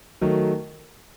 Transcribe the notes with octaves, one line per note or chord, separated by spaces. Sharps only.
D#3 F#3 A3